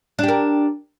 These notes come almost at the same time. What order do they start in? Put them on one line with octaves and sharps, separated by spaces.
D4 G4 A#4